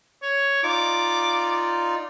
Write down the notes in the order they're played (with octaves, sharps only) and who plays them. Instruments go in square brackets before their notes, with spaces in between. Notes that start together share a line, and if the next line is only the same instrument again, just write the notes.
[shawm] C#5
[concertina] D#4 F4 D5 [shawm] D6